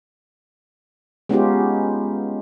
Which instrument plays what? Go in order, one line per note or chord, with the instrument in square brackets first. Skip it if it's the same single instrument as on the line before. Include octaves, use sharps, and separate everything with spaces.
[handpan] G#3 B3 C#4 D#4 F4 G4